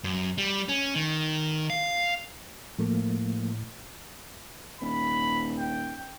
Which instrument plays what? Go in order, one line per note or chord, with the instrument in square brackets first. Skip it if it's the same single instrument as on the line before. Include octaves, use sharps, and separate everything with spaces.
[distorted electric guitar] F#2
G3
C#4
D#3
F5
[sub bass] A2 [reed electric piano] F3 A3 A#3
[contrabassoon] D#1 [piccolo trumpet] B5
[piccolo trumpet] G5